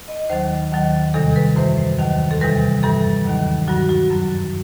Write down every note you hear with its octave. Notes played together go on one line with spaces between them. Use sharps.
D#5
D#2 D#3 F#3 C5
D#2 D#3 F#3
E2 C3 D#3 G3 A4
B4
F#2 E3 G3 C5
C5
D#2 D#3 F#3
A4
E2 C3 E3 G3 B4
G2 E3 G3 A4
D#2 D#3 F#3
G2 F#3 F#4
F#4
F#2 F#3